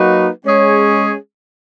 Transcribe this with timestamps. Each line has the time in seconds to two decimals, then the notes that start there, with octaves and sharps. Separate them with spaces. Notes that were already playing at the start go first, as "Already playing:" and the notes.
Already playing: F#3 A#3 D#4 F#4 B4
0.46 G#3 C#4 G#4 C#5